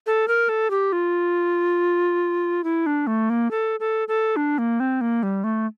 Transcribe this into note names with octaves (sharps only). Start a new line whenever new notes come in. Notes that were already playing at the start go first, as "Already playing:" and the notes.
A4
A#4
A4
G4
F4
E4
D4
A3
A#3
A4
A4
A4
D4
A#3
C4
A#3
G3
A3